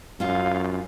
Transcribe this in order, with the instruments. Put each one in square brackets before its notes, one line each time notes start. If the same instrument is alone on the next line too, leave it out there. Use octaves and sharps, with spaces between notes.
[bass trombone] F#2 [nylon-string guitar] C#4 F4 [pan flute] F5